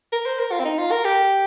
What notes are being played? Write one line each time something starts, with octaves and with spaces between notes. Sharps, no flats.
A#4
C5
A#4
F4
C4
D#4
F4
A#4
G4